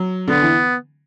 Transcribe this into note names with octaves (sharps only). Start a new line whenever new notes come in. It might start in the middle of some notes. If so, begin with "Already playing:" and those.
Already playing: F#3
D3 B3
E3